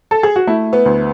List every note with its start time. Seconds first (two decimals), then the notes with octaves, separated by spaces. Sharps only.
0.11 A4
0.23 G#4
0.36 F#4
0.47 A3 E4
0.73 B3
0.86 D2